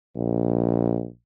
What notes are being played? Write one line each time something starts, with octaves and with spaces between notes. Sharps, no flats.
A#1